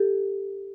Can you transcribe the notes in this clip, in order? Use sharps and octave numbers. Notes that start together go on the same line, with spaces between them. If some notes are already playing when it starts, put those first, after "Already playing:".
Already playing: G4 A4